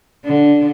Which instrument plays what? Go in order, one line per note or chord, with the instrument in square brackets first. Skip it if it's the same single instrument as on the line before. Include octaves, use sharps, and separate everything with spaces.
[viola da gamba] D3